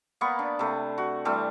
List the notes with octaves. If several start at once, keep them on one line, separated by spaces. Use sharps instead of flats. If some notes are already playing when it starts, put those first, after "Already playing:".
A#3 B3 B5 C#6
D4
C3 A3
F#4
E3 G3 A3 C4